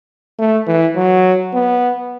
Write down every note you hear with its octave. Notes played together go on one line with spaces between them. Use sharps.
A3
E3
F#3
B3